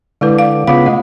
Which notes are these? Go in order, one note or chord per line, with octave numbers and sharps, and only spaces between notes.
D3 G#3 E4 B4
D5 F5
C#3 B3 F4 F5
A3 D#5